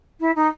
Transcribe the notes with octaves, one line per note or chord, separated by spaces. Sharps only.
E4
D#4